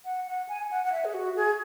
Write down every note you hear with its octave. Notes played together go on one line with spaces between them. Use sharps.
F#5
F#5
G#5
F#5
F#5
E5
G#4
F#4
G#4